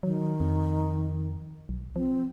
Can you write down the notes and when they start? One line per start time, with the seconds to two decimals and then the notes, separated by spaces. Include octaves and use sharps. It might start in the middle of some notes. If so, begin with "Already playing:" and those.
0.03 D#3 F#3
0.40 F2
1.69 B1
1.96 F3 C4